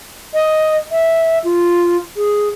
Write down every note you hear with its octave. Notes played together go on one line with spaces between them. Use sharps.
D#5
E5
F4
G#4